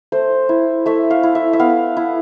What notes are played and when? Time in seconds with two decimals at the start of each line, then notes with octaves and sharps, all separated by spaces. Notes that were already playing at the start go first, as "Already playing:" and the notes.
0.12 A3 C5
0.49 E4
0.86 A3 E5
1.10 F5
1.23 E4
1.35 E5
1.53 E5
1.59 B3 F5
1.97 E4